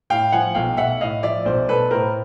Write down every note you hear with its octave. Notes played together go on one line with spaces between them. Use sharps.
A2 F5 G5
F3 F#5 G#5
B1 F5 G5
B1 E5 F#5
A2 D#5 F5
F3 D5 E5
B1 C5 D5
B1 A4 B4
A2 A#4 C5